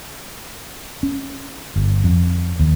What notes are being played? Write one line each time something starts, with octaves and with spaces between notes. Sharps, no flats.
C#4
G1
F2
D#2